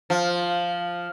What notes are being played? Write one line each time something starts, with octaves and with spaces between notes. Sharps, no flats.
F3